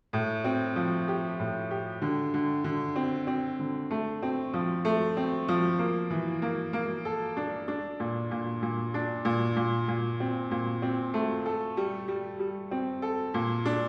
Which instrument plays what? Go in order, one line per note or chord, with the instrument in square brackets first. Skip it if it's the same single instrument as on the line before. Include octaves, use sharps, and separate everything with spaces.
[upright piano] A2
C4
F3
G4
A2
G4
D3
D3
D3
C4
C4
D3
A3
C4
F3
A3
C4
F3
A#3
E3
A#3
A#3
A4
D4
D4
A#2
A#2
A#2
D4
A#2
A#2
A#2
C4
A#2
C4
A3
A4
G3
G3
G3
C4
A4
A#2
D4